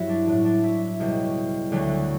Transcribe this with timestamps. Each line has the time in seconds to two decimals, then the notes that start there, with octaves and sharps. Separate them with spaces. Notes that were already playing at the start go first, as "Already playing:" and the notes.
Already playing: G2 F#3 E4 F#4
0.09 D4
0.27 A2 F#3
0.45 D4
0.64 E4
1.00 C#2 B2 G3
1.72 D2 D3 F#3